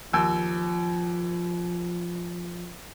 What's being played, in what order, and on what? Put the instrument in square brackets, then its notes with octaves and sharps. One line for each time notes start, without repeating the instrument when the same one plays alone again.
[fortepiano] D#2 E6 [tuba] F3